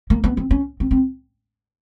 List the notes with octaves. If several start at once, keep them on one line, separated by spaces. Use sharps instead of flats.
A#3
B3
C4
C#4
C4
C4